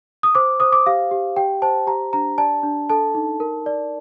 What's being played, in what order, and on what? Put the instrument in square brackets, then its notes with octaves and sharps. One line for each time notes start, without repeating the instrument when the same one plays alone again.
[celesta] D#6
C5 D6
C5 D#6
D6
G4 F5
G4
G4 G5
C5 A5
G4 A#5
D4 A#5
D5 A5
D4
A4 A5
D#4
A#4
D5